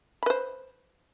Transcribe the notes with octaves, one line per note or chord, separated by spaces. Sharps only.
B4 C5 B5